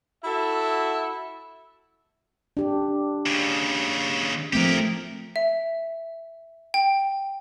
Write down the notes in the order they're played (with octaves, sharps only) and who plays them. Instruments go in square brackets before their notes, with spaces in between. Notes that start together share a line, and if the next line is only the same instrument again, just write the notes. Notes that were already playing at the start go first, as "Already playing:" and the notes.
[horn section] E4 F#4 A4 E5
[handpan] D4 G4
[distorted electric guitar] D#2 C#3
[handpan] F3 A3 C4 [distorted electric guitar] G4 A#4
[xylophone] E5
G5